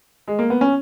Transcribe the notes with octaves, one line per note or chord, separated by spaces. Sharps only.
G#3
A#3
B3
C#4